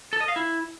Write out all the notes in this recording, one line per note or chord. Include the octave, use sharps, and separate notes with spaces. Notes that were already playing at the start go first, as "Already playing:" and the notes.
A4
D#5
F5
E4